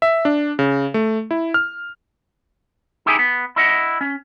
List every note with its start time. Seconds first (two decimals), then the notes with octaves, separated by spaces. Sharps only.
0.02 E5
0.25 D4
0.59 C#3
0.94 A3
1.31 E4
1.54 F6
3.06 D#4 E4 G4 G#4 G#5
3.19 B3
3.56 E4 D#5 F#5
4.01 C#4